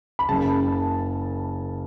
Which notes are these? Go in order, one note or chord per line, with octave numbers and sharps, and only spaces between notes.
B5
F#1 F#2 C#3 A5